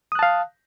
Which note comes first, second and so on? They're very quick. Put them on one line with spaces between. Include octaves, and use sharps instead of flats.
D#6 F#6 A5 F5